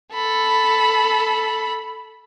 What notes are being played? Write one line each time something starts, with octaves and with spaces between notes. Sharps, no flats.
A4 B5